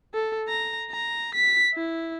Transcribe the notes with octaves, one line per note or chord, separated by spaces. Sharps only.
A4
A#5
A#5
B6
E4